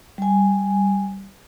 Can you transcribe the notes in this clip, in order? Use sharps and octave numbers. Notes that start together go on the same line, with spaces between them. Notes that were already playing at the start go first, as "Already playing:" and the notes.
G3 G#5